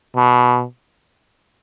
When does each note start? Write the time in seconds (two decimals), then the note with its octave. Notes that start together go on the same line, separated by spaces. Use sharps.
0.16 B2